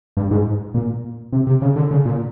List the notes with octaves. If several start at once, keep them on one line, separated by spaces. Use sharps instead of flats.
G2
G#2
A#2
C3
C3
C#3
D3
C#3
A#2